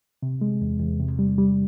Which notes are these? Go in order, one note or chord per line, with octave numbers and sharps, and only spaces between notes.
C3
G#3
E2
E2
C3
G3
G3